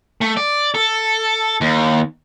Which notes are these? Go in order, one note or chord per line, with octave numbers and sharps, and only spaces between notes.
A3
D5
A4
D#2